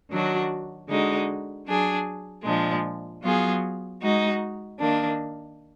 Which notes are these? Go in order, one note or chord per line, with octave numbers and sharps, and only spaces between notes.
D#3 F#3 D4 F#4
D3 G#3 D#4 F#4
F#3 D4 G#4
A#2 F3 G#3 D4
F#3 B3 F4 G#4
G#3 D#4 F#4
D#3 A#3 D4